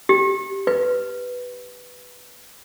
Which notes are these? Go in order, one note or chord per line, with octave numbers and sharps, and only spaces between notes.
G4
B4